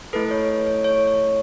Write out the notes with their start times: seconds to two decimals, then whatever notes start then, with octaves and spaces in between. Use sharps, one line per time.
0.13 A3 E4 A4 B4
0.31 C#5
0.66 C#5
0.84 C#5
1.07 C#5